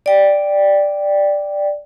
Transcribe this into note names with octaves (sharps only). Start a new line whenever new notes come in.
D5 G5